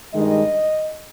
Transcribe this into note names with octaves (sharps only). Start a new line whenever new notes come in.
G2 D#3 G#3 D#5